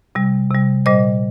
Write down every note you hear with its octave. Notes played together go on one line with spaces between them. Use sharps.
C3 G3
C3 G3
A#2 G3 C5 D#5